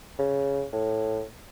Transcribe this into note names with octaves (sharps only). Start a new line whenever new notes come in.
C#3
A2